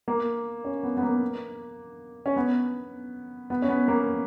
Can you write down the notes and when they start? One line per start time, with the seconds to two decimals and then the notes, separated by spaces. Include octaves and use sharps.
0.08 A#3
0.64 C#4
0.83 B3
0.97 B3
1.03 A#3
2.26 C#4
2.36 B3
3.50 B3
3.62 C#4
3.69 B3
3.88 A#3